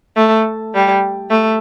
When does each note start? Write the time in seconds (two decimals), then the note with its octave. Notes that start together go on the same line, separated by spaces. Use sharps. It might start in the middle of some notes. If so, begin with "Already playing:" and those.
0.16 A3
0.74 G3
1.30 A3